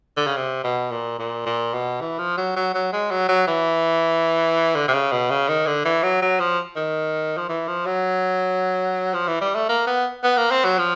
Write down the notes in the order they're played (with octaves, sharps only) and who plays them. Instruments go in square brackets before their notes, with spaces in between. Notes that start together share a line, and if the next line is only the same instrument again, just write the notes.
[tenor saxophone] D3
C#3
C3
B2
A#2
A#2
A#2
B2
E3
F3
F#3
F#3
F#3
G#3
F#3
F#3
E3
D3
C3
C#3
B2
C#3
D#3
D3
E3
F#3
F#3
F3
D#3
F3
E3
F3
F#3
F3
E3
G3
A3
A#3
B3
B3
A#3
C4
F#3
F3